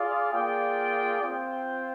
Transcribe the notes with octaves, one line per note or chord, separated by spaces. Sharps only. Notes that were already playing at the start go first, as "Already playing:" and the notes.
Already playing: F4 G#4 D5 F5
A#3 F4 G#4 D5 G5
C4 F4 C5 G5